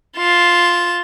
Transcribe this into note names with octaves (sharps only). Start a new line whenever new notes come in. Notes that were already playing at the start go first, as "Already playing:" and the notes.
F4 E7